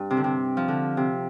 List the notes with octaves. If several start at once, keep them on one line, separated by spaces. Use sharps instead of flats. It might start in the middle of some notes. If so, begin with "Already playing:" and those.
Already playing: G2
C3
D3
C3
F3
D3
C3